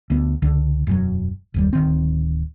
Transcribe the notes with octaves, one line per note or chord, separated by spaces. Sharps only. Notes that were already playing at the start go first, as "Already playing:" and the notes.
D2 B3
C#2 D3
E1 F#2 F#3
F#1 D#2 G3
D1 D#3 C4